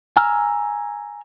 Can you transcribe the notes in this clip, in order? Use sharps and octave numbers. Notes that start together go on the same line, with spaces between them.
G#5 A#5 E6 F6